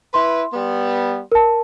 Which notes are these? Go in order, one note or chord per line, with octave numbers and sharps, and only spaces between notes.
E4 B4 C6
G3 B3
A#4 A5